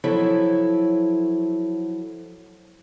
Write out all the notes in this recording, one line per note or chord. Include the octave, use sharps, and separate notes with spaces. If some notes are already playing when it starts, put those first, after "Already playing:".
F3 F#3 E4 A4 C#5